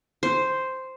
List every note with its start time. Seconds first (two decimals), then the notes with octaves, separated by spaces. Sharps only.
0.23 C5